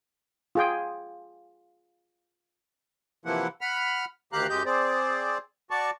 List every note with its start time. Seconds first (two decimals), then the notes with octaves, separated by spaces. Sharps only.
0.55 F4 G#4 G5
3.25 C3 E3 F3 A#3 E4 F#5
3.61 F#5 B5 F6
4.33 D2 D#3 G4 F5 A#5 F#6
4.49 F#2 G#3 G4 D#5 G6
4.66 C4 G#4 C5 D5
5.71 F#4 D5 A5 C#6